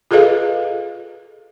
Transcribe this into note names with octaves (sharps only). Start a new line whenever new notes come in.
F4 G#4 A4 B4 D#5 F5